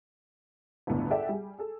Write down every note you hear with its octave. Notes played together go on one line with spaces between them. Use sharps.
G1 C#2 A2 B3 D4
G#4 A4 D5 E5 F#5 G5
G3 G#4
G#4 A4